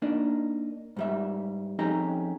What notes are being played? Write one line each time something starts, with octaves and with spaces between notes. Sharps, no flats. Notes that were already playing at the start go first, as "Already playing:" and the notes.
A#3 D4 D#4
G#2 G3 E5
F2 C#4 D#4 G4 G#4 A#5